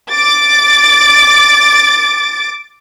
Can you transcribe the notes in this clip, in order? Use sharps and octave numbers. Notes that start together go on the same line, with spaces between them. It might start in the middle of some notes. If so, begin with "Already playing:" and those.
D6 A6